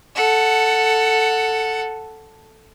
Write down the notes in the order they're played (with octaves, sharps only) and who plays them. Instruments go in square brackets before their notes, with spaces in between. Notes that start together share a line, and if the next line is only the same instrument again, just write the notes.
[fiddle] A4 F#5